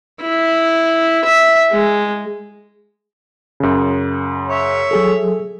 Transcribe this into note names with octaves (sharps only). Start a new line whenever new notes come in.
E4
E5
G#3
F#2 C#3
C#5 E5
F#3 G#4 A4